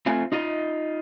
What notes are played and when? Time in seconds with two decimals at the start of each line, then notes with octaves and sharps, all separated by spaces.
0.06 A3 C4 F4 G#5
0.32 D#4 F4 D#5